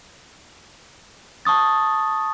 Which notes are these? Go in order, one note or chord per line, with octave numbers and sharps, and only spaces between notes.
A5 C#6 D#6 A6